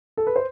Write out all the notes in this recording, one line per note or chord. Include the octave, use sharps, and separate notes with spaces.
A4
B4
C5